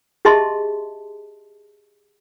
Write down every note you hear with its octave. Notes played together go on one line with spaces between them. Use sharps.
G4 G#4 D#5 E5 A5 C6